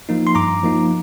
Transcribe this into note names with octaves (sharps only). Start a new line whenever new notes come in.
F3 A#3 D#4
C6
G2 A#5 D6
F3 A#3 D#4